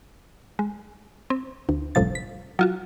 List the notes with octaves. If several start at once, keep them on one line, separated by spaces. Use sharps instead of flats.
G#3
C4
D2
G1 C#2 A2 C3 F3 A6
B6
F#3 F4 F#4